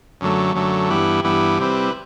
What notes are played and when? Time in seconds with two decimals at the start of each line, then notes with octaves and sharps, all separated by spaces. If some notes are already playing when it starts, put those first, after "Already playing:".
0.21 F#2 D3 F#3 A3
0.55 F#2 D3 F#3 A3
0.90 G2 E3 B3 E4 G4
1.24 G2 E3 B3 E4 G4
1.58 C3 G3 C4 E4 B4